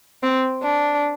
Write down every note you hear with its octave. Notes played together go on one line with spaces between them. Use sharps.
C4
D4